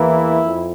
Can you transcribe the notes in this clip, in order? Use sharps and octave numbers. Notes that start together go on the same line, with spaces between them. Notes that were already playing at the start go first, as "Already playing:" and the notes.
Already playing: E2 E3 A#3 E4
F2